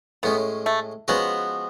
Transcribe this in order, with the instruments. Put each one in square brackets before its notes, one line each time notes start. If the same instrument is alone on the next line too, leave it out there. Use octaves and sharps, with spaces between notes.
[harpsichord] A2 G#3 C#4 [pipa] B3
[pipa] A3
[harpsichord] F3 G#3 C#4 F#4 [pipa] B3